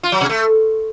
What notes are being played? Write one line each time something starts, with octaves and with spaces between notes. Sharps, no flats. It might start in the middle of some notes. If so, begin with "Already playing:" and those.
F4
F#3
C3
A3